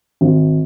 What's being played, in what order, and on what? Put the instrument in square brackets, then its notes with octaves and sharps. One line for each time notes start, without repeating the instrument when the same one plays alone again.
[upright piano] G#1